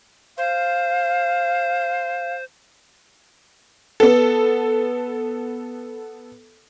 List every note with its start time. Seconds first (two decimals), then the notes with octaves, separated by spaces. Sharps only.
0.38 C5 F5
4.00 B3 A4